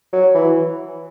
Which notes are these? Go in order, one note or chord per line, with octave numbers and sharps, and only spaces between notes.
F#3
E3